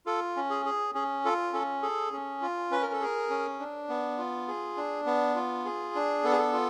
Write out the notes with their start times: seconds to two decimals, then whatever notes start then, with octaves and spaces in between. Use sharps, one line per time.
0.06 F4 A4
0.36 C#4
0.50 G#4
0.66 G#4
0.94 C#4 G#4
1.25 F4 A4
1.53 C#4 A4
1.82 G#4 A4
2.12 C#4
2.42 F4
2.71 C#4 B4
2.82 A#4
2.93 A4
3.01 G#4 A#4
3.30 C#4
3.59 D4
3.89 B3
4.18 F4
4.48 G#4
4.77 D4
5.06 B3
5.35 F4
5.65 G#4
5.95 D4
6.24 B3 A4
6.32 G#4
6.38 A4
6.53 F4